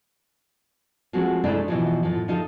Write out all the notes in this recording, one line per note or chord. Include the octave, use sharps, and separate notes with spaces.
F3 G#3 A3 C4 F#4
C3 G#3 A3 D4 E4 A4
B2 E3 F3
A2 F3
F3 D#4 F4 A4